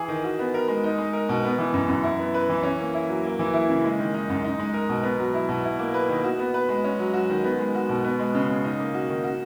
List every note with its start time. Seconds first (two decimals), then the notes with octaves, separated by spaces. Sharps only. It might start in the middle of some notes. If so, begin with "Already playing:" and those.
Already playing: E3 G#4
0.08 D#3
0.24 F#4
0.39 B3
0.54 A#4
0.68 G#3
0.84 D#4
0.98 G#3
1.13 A#4
1.29 B2
1.44 B3
1.59 E3
1.74 F#2
1.89 F#2
2.03 E4
2.19 B3
2.34 B4
2.49 E3
2.63 C#4
2.79 A#3
2.94 E4
3.09 F#3
3.24 A#3
3.39 E3
3.54 E4
3.69 C#3
3.84 G#3
3.99 D#3
4.14 D#4
4.29 F#2
4.44 D#4
4.59 G#3
4.74 A#4
4.89 B2
5.03 B3
5.19 F#3
5.34 E4
5.49 B2
5.64 E4
5.79 A#3
5.94 B4
6.09 D#3
6.23 F#4
6.39 B3
6.54 B4
6.69 G#3
6.84 C#4
6.99 F#3
7.14 F#4
7.30 D#3
7.44 B3
7.59 G#3
7.75 F#4
7.89 B2
8.04 B3
8.19 G#3
8.35 C#3
8.49 C#3
8.64 D#4
8.80 A#3
8.94 F#4
9.09 D#3
9.24 F#4